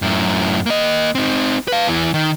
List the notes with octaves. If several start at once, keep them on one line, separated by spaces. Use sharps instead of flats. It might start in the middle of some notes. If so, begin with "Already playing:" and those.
F#2 A2
A#3 D#5
C4 D#4
B4 F5
E2 E3
D#3